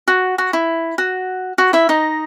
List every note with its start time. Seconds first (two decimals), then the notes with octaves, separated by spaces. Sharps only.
0.08 F#4
0.38 F#4
0.53 E4
0.98 F#4
1.58 F#4
1.73 E4 E5
1.89 D#4 D#5